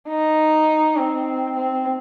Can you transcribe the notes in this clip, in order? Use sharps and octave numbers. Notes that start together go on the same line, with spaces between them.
D#4
C4
C4